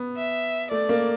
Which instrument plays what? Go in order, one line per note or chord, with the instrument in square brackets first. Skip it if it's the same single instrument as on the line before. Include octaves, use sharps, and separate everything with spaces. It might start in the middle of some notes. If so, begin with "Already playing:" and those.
Already playing: [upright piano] B3
[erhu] E5
[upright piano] A3 [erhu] D5
[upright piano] A#3